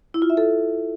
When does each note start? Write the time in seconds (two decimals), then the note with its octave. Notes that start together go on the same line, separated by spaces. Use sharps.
0.14 E4
0.22 F4
0.30 E5
0.37 A4